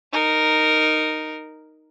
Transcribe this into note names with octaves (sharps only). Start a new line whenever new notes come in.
D#4 A#4